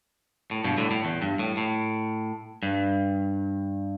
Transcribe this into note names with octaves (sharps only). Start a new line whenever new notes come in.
A2
G2 B2
A2 D3
A2
E2
G2
A2
A2
G2